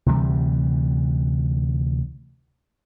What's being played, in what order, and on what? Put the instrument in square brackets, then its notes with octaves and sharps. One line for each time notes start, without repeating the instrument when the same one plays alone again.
[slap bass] D2 C3 E3 G3